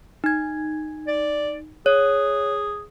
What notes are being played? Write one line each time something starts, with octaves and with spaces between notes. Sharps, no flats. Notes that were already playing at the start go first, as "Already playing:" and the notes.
D#4 G#6
D5
G#4 C#5